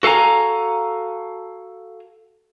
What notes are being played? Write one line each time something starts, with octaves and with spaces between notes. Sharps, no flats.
F#4 A4 F5 G#5 A#5